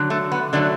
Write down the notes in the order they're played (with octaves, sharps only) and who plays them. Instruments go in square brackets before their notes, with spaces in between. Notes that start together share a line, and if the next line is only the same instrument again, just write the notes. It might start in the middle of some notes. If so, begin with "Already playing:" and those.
Already playing: [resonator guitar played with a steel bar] D3 F#3
A3
B3
D3 F#3 A3 D4